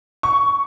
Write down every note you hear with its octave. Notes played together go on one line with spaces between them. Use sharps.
C#6